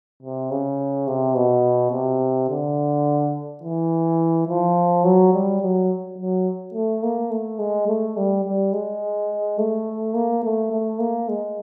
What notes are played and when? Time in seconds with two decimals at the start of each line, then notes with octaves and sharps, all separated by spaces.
0.22 C3
0.51 C#3
1.07 C3
1.35 B2
1.92 C3
2.49 D3
3.63 E3
4.48 F3
5.04 F#3
5.33 G3
5.61 F#3
6.18 F#3
6.74 A3
7.03 A#3
7.31 A3
7.59 G#3
7.88 A3
8.17 G3
8.44 G3
8.73 G#3
9.58 A3
10.14 A#3
10.43 A3
10.72 A3
10.99 A#3
11.28 G#3